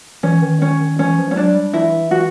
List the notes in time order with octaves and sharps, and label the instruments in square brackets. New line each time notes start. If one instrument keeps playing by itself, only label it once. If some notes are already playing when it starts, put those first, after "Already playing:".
[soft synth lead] E3 [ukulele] C#4
[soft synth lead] D#3
[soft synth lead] D#3 [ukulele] C#4
[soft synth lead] D#3
[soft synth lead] E3 [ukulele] C#4
[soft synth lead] F3
[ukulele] C#4
[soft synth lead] F#3 [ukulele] D4
[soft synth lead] G3
[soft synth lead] E3 [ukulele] E4
[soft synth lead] E3
[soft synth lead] E3 [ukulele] F#4